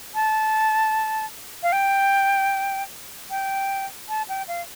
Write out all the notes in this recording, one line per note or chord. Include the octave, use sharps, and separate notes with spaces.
A5
F5
G5
G5
A5
G5
F5